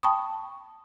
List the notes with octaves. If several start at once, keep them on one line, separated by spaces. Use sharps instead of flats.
G5 A5 B5 C#6 D#6